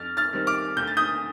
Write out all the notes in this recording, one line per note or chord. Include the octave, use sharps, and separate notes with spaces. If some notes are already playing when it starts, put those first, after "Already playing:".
Already playing: F2 F6 A6
F6 A6
D#3 G3 C4
D6 F6
D2 G6
A6
D#6 G6